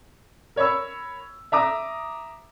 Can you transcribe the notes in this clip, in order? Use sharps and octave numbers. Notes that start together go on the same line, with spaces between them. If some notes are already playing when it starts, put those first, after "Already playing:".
A#4 C#5 B5 C#6 E6
E5 A#5 D6 D#6